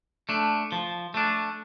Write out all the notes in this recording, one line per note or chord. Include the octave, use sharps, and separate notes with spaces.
A3 D4
F3
A3 D4